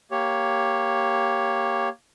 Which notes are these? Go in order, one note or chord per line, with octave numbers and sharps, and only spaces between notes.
A#3 G4 C#5